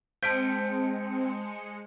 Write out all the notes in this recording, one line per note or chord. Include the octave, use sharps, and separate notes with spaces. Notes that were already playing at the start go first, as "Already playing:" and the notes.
G#3 C4 C5 A5 G6 B6 C#7 D7